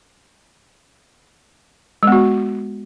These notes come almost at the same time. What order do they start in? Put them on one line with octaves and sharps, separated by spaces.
G#3 B3 F#4